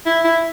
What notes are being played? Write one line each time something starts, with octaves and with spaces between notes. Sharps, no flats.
E4
E4